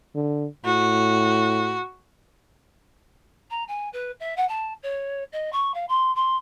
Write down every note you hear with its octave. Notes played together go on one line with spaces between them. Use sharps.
D3
A2 F#4
A#5
G#5
B4
E5
F#5
A5
C#5
D#5
C#6
F5
C6
C6